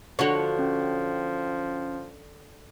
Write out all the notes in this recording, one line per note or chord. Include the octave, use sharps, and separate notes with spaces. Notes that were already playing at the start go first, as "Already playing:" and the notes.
D3 F3 F#4 C#5
C#4